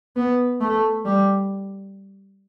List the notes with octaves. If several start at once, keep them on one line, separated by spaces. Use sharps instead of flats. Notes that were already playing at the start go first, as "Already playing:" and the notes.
B3
A3
G3